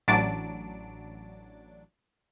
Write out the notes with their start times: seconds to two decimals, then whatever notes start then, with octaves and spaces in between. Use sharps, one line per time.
0.08 A1 F#3 D4 A6 D7